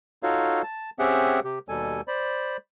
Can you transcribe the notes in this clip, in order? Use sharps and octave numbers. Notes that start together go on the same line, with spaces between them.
D#4 F4 F#4 A4 C#5 F5
A5
C4 C#4 G4 G#4 E5 F#5
C3 G4
D#2 B2 G3 A4 G#5
C5 D5 B5